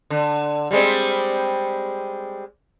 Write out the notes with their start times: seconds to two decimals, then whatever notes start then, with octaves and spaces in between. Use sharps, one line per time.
0.10 D3
0.71 G3 G#3 C4